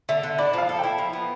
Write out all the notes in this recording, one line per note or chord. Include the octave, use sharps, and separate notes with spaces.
D3 E5
D3
E4 D5
F3 F5
A4
E4 G5
F3
B3